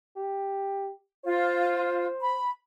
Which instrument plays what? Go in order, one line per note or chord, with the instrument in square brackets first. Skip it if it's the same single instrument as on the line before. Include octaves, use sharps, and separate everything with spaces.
[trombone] G4
[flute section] F4 [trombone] C5
[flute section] B5